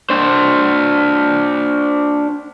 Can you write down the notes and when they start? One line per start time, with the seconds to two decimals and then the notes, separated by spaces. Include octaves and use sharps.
0.10 D4 C5